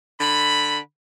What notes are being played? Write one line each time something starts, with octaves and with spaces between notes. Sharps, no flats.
D3 B5